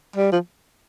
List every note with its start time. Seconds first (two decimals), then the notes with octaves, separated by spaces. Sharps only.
0.16 G3
0.32 F3